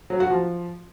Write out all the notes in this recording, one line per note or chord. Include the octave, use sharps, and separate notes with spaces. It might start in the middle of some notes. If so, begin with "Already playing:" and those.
F#3
F#4
F3